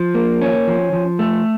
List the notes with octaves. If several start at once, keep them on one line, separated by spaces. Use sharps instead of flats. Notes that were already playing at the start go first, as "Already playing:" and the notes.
Already playing: F3
A#3
C#4
F3
F3
A3